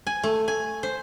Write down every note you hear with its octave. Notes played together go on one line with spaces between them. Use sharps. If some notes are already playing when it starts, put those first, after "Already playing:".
G#5
A3
G#5
C5